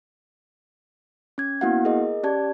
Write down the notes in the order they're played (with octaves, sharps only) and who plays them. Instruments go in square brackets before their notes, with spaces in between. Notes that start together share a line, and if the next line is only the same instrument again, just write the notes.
[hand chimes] C#4 G#6
A#3 B3 E4 F#4 F5 F#5
G#4 A#4 D#5
C#4 G4 D5 A5 G#6